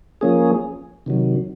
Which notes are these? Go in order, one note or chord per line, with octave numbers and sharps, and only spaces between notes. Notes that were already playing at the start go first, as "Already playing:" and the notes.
F3 A#3 C#4 G#4
C3 D#3 F#3